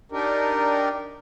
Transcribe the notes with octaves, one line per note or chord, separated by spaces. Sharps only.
D4 D#4 G4 A#4